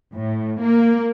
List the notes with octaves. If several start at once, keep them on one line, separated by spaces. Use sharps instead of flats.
A2
A#3